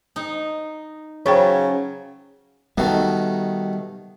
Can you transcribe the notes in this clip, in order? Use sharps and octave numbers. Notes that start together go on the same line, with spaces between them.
D#4
C#3 F#3 C#4 C5 C#5 G5
B2 D#3 G3 A3